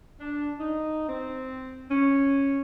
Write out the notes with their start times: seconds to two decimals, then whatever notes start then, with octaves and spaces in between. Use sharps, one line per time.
0.20 D4
0.60 D#4
1.09 C4
1.90 C#4